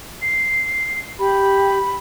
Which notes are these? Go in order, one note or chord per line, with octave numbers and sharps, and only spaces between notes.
C7
G4 B5